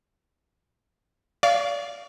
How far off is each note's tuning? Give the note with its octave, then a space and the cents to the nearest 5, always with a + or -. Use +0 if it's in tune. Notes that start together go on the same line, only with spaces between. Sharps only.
D5 -30 F5 -15 C#6 +25